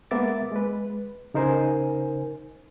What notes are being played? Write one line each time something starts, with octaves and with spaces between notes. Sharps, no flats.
G#3 A#3 B3 E5 D6 A6
G#3 B4
C#3 D#4 A#4 C5 G#5